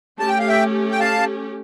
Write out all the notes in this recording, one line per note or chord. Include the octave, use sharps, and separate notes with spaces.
A3 C#4 G4 A5
G5
F5
E5 G5
G5
F5 A5